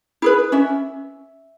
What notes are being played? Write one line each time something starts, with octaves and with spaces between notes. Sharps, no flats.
E4 G#4 B4
C#4 E5